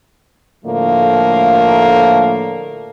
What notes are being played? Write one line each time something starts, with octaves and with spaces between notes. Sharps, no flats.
A2 D3 F3 A3 A#3